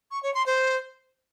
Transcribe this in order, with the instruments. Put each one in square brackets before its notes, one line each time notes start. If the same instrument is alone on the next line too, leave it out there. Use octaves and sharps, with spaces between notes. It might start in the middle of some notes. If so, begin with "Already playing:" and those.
[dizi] C#6
C#5
C6
C5